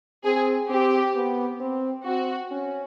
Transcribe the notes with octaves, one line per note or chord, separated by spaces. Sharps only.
C4 G#4
C4 G4
B3
C4
C4 F#4
C#4